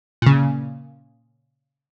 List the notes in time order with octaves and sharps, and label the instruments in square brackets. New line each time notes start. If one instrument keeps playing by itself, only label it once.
[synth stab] A#2 C#3